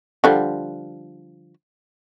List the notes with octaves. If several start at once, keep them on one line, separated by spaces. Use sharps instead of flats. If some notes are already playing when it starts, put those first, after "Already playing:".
D3 F3 G3